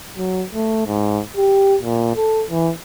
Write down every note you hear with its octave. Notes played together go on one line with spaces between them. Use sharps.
F#3
A3
G#2
G4
A#2
A4
E3